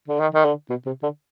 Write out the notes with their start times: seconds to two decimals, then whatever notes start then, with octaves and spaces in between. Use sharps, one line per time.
0.08 D3
0.20 D#3
0.34 D#3
0.45 D3
0.70 B2
0.86 C3
1.03 D3